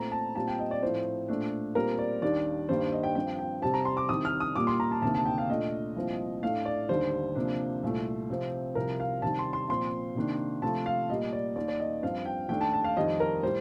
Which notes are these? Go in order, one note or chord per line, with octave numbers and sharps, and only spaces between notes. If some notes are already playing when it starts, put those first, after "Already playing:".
Already playing: A#2 A3 C4 A#5
A5
A#2 G3 C4 A5
G5
D#5
D5
A2 F3 A3 C4 C5
A#2 A3 D4
A#2 G3 C4 A#4
D5
D#2 D#3 G3 D4 D5
G2 D#3 G3 A#3 D4 C5
D#5
G5
G2 F3 C4 G5
G5
C3 G3 C4 A5
A#5
C6
D6
C2 C3 D#3 D#6
F6
D#6
A#2 G3 A#3 D6
C6
A#5
A5
D2 C3 D#3 A#3 A5
A5
G5
F5
A#2 A3 D4 D#5
C2 A#2 F3 C4
A2 A3 D4 F5
D5
D#2 D3 G3 C5
C3 F3 A#3 D4
C2 A#2 A3
C3 F3 C4
C2 C3 F3 A#4
F5
C3 D#3 G3 A5
C6
C6
A#2 F3 C4 C6
C3 D#3 A#3 D4
C3 F3 A3 A5
F5
A#2 G3 A#3 D#5
D5
D#2 D#3 A#3 D5
D5
D#5
G2 F3 C4 F5
G5
D#2 D#3 A3 D4 G5
A5
A5
F5
F2 D#3 G3 D#5
A#4
A2 G3 C5